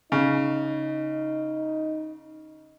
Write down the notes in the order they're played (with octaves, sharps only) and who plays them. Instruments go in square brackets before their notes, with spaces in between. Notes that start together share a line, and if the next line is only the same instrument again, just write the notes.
[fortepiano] C#3 [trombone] D#4